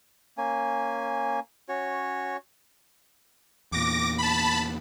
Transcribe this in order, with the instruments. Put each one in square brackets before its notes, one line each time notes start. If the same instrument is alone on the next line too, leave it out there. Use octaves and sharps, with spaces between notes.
[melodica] A#3 C#4 G#5
C#4 F#4 C#5
[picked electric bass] E2 A#2 [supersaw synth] D6 A#6
[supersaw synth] A5 B5